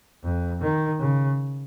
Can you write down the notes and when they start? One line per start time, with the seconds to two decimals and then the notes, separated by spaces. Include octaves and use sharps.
0.24 F2
0.61 D#3
1.00 C#3